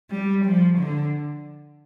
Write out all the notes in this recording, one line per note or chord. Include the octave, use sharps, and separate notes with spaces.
G3
F3
D3